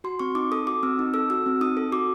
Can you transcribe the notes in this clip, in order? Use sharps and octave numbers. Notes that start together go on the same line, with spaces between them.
F#4 C6
C4 C#6
D#4 D6
A4 D#6
F#4 D6
C4 E6
D#4
A4 E6
F#4 E6
C4
D#4 D#6
A4
F#4 D6